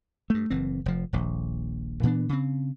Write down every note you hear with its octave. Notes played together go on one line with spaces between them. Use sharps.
G2 A3
F#1 E3 C4
F1 F3
D#1 A#1
A#2 E3 B3 D4
C#3 C4